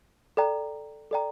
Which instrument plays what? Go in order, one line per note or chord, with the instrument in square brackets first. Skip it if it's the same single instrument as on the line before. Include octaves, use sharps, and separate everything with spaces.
[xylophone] A4 D5 G5 A#5
A4 D5 G5 A#5